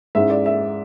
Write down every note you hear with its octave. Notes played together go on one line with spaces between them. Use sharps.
G#2 G#3 C#4 E4 E5
D5
E5